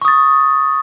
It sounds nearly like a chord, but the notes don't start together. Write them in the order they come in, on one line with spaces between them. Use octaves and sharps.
C#6 D#6 A6